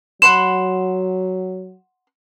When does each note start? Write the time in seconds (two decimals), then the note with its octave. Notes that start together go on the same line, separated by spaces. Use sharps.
0.22 F#3 F#5 B5 C6 E7